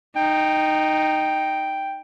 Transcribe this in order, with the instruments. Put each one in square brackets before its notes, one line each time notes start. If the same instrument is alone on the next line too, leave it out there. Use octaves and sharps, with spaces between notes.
[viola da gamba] D#4 [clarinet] G5